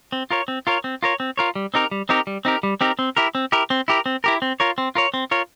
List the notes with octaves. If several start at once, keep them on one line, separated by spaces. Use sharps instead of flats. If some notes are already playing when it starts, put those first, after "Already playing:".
C4
F4 A#4 C#5
C4
F4 A#4 C#5
C4
F4 A#4 C#5
C4
F4 A#4 C#5
G3
C4 D#4 G4 A#4
G3
C4 D#4 G4 A#4
G3
C4 D#4 G4 A#4
G3
C4 D#4 G4 A#4
C4
E4 G4 A#4
C4
E4 G4 A#4
C4
E4 G4 A#4
C4
E4 G4 A#4
C4
F4 A#4 C#5
C4
F4 A#4 C#5
C4
F4 A#4 C#5